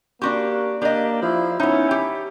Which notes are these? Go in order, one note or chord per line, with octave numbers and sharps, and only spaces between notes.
A#3 D4 F#4 G4
A#3 D4 G4 D#5
F3 E4
B3 C#4 D#4 E4
G4